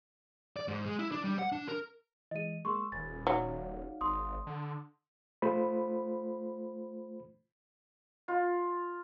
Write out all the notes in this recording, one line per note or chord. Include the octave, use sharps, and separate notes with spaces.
D5
G#2
G#3
E4
D4
G3
F#5
D4
A#4
E3 G#3 D#5 D#7
G#3 A#3 C6 C#6 E6
D#1 G#5 B5 A6
F#3 D#4 D5 F5
G#1 C6 D#6
D3
A3 F4 C5 B5
F4